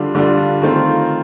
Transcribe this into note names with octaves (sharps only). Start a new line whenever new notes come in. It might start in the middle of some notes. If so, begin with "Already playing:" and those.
Already playing: D3 G3 D4 F4
D3 G3 D4 F4
D#3 A3 C4 F4